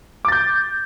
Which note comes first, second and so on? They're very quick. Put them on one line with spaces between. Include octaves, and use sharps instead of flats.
D6 A6 G6